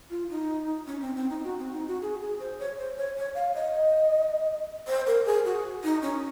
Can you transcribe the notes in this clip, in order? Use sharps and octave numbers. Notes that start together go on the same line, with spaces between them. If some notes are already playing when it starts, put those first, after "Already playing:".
F4
D#4
C#4
C4
C4
D#4
F#4
C4
D#4
F#4
G#4
G#4
C5
C#5
C5
C#5
C#5
F5
D#5
C5
A#4
G#4
F#4
D#4
C#4